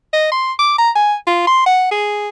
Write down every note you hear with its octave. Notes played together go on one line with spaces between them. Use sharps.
D#5
C6
D6
A#5
G#5
F4
C6
F#5
G#4